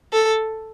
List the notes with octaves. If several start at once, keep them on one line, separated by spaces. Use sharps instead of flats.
A4